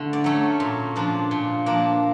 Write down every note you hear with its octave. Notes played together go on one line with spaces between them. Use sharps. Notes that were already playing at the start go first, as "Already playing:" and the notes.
Already playing: D3 A3
D5
F#3 A3 C#4
A#2
F3 A#3 D4
A#2
F3 A#3 D4